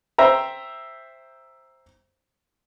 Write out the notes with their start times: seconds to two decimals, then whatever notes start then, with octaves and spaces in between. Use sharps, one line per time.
0.18 C5 E5 G5 A#5